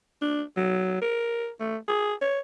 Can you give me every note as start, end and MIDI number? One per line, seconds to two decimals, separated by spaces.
0.22 0.43 62
0.57 0.98 54
1.02 1.50 70
1.60 1.77 57
1.88 2.14 68
2.21 2.40 73